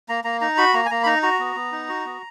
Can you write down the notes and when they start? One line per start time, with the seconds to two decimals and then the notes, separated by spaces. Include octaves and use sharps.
0.09 A#3 A#5
0.24 A#3 A#5
0.41 D#4 A#5
0.57 F#4 B5
0.73 A#3 A#5
0.86 G#5
0.91 A#3 A#5
1.03 B5
1.06 D#4 A#5
1.23 F#4 A#5
1.39 B3
1.56 B3
1.72 D#4
1.89 F#4
2.05 B3